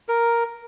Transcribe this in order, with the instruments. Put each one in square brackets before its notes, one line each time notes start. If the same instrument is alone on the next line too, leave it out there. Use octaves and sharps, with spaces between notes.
[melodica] A#4